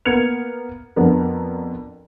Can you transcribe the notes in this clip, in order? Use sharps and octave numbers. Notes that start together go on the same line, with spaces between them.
A#3 B3 F6 G#6 C#7 F7
F2 B3 D4 A#4